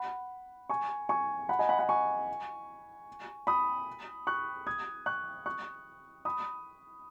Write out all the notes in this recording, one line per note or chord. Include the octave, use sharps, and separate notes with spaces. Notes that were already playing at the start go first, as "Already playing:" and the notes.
Already playing: F#5 B5
G#5 C#6
G#5 C#6
F#5 B5
D#5 G#5
F#5 B5
F#5 B5
G#5 C#6
B5 D#6
C#6 F#6
D#6 G#6
C#6 F#6
C#6 F#6
B5 D#6